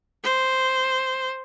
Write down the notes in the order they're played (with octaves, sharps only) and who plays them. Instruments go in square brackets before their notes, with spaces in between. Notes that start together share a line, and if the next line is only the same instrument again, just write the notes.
[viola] C5